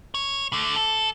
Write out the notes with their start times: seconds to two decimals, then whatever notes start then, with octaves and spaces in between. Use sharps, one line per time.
0.15 C#5
0.53 D3 A3
0.76 A4